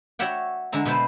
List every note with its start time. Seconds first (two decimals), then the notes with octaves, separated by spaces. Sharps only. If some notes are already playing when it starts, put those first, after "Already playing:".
0.19 F#4 C#5 D5 E5 F#5 G5
0.72 D3 G#3 E5 A#5
0.85 B2 G#3 B4 C5 A5